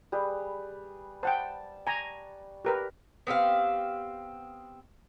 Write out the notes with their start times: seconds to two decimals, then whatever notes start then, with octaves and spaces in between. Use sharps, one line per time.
0.12 G3 G#4 B4
1.23 C5 F#5 G5 A5
1.87 G#5 A#5 C#6
2.65 G4 A#4 B4
3.27 B3 C4 G4 F5